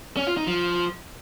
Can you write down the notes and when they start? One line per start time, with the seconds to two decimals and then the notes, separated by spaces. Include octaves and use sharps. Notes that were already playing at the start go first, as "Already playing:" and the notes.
0.17 C#4
0.27 F4
0.37 D#4
0.47 F3